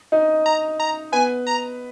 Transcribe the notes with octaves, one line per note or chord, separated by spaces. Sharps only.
D#4 D#5
A#5
A#5
B3 B4 G#5
A#5